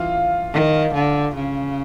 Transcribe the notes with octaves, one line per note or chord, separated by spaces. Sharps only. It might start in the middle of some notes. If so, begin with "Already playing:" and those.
Already playing: E3 F4 F5
D#3
D3
C#3